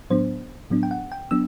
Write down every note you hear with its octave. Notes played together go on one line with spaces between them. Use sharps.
A2 F#3 B3 D4 C5
A2 F#3 B3 D4
G5
F#5
G5
F#3 B3 D4 E6